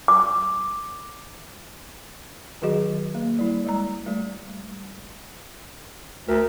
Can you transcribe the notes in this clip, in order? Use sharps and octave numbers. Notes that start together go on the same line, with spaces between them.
D6
D#3 F#3 F#4 G#4 D#5
A#3
G3 E4
G3 G#3 A#5
G3 A3
D2 A#4